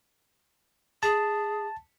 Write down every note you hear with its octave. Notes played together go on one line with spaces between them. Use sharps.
G#4 A5